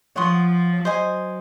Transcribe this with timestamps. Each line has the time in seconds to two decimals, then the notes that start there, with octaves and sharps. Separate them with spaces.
0.16 F3 C#5 F#5 C6 D#6
0.85 F#3 C5 D#5 G#5